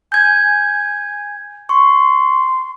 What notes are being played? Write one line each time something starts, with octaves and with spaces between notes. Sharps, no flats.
G#5 G6 G#6
C6 C#6